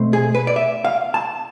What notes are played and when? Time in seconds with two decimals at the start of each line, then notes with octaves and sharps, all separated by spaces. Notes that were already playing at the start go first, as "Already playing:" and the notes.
Already playing: B2 A3 C4
0.13 G#4
0.35 B4
0.47 D5
0.56 E5
0.85 F5
1.14 A5